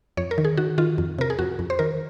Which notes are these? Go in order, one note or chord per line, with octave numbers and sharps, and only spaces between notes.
F2 C#5
A#4
D#3
G#4
D#3 F#4
D#3 F4
F2
C3 A#4
G#4
F2 F#4
F2
C5
D#3 A#4